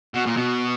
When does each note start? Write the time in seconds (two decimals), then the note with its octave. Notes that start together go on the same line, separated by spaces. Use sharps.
0.14 B2
0.26 A#2
0.37 B2